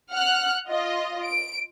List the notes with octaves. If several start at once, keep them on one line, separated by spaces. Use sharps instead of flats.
F#5 F6 F#6
F4 D#5
D7